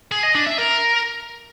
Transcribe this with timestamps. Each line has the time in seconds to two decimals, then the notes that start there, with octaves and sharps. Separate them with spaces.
0.12 G#4
0.23 D#5
0.35 D4
0.47 E5
0.58 A#4